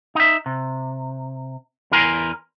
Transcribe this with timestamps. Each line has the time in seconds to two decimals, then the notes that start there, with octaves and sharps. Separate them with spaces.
0.15 D#4 E5
0.46 C3
1.91 E2 E4 A#4 G#5 A#5 C6